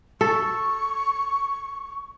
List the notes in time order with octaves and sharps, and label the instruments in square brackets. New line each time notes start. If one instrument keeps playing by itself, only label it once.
[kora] A4 [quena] C#6